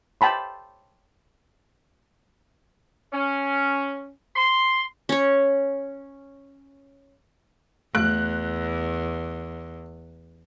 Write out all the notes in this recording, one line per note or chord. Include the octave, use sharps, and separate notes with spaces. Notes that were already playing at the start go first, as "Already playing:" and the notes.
G5 A5 B5 C6
C#4
C6
C#4 C#5
E2 A3 F#6